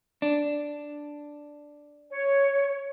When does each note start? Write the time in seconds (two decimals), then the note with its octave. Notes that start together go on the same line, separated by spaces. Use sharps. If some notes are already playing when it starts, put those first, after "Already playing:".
0.22 D4
2.11 C#5